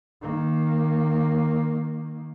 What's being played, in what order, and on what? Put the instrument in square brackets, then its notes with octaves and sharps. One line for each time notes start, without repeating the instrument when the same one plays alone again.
[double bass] D#3 A#3